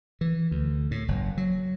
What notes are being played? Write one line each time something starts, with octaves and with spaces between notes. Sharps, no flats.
E3
D2
A2
F#1
F#3